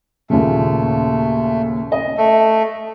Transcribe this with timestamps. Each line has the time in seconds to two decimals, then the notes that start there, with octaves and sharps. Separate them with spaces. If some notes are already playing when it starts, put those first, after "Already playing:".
0.30 D#2 A#2 C#3 A3
1.92 D#5
2.17 A3